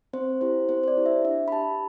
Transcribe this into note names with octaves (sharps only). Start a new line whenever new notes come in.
C4 C5
E4 G4 C5
C4 C5
C5
D5
E4 G4
E5
D4 E5
B5
G4 A5